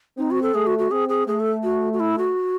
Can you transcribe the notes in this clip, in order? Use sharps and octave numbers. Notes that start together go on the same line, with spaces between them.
C4 D#4
F#4
A4
A3 G#4
F#4
F#4
C4 G#4
G#4
A3 G#4
A4
F#4
F#4
E4
F#4